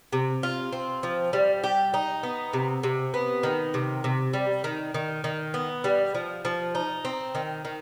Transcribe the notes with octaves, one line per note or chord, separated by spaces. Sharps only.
C3
F4
C4
F3
G3
G4
D#4
B3
C3
C3
B3
D#3
C3
C3
G3
D#3
D#3
D#3
B3
G3
F3
F3
D#4
C4
D#3
D#3